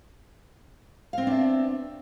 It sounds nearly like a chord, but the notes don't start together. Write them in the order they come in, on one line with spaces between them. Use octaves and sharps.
F5 C4 B3 D4 E5